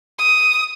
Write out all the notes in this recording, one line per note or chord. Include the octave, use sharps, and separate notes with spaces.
D#6